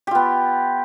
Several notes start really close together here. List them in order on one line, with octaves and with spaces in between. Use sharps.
G4 F4 B3